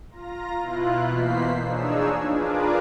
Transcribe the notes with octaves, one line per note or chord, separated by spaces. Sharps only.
F4 A#5 A#6
B2 E4 F4 F#6
B2 E3 A#3 C5 B6 C7
F3 D4 D#4 G#4 C#5 E6
D4 F4 G#4 A#4 B4 D6